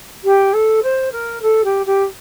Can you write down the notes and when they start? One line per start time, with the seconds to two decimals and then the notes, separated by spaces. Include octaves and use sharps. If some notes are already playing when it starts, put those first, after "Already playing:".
0.24 G4
0.53 A4
0.82 C5
1.12 A#4
1.42 A4
1.64 G4
1.86 G4